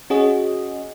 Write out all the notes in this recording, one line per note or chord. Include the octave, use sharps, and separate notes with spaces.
C#4 F#4 G#4 D#5